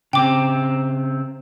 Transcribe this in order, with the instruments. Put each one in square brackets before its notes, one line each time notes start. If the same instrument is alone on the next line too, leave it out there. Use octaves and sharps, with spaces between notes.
[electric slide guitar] C#3 C4 [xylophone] G5 D6